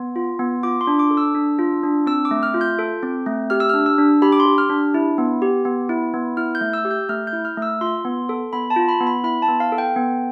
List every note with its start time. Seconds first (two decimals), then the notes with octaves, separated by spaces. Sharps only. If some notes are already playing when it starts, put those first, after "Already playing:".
Already playing: B3
0.16 F4
0.39 B3
0.63 F4 D6
0.81 C6
0.87 D4
0.99 D6
1.11 A4
1.17 E6
1.35 D4
1.59 F4
1.83 D4
2.07 C4 E6
2.25 D6
2.31 A3
2.43 F6
2.54 F4
2.61 G6
2.79 A4
3.03 C4
3.26 A3
3.50 G4 F6
3.60 E6
3.69 D4 F6
3.86 E6
3.98 D4
4.22 G4 B5
4.32 D6
4.40 C6
4.46 G4
4.58 F6
4.70 D4
4.94 E4
5.18 B3
5.42 G4
5.65 B3
5.89 E4
6.14 B3
6.37 E4 F6
6.55 G6
6.61 A3
6.73 E6
6.85 G4
6.91 G6
7.09 A3 F6
7.27 G6
7.33 E4
7.45 F6
7.57 A3
7.62 E6
7.81 F4 C6
8.05 B3
8.29 A4
8.53 B3 B5
8.70 A5
8.76 F4
8.89 B5
9.01 B3
9.07 B5
9.24 E4 B5
9.42 A5
9.48 B3
9.60 F5
9.72 A4
9.78 G5
9.96 B3